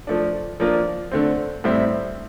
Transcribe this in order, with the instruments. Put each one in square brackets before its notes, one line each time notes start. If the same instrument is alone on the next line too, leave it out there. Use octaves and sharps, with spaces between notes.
[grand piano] F3 A3 D4
F3 A#3 D4 F4
D3 A3 C4
A2 G3 C4 E4